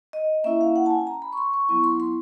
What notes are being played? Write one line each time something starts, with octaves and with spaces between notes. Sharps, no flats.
D#5
A#3 C#4 E4 E5
F5
F#5
A5
G#5
A#5
B5
C#6
C6
C#6
F#3 B3 E4 C#6
C6
C6